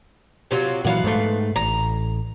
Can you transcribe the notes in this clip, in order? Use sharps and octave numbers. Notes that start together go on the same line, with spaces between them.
C3 F#3 F4
A#2 E3 F#3 B3 F5 F#5
G#2 A3
A1 A#5